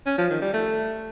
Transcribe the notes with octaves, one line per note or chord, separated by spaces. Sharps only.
C#4
F3
D#3
G3
A3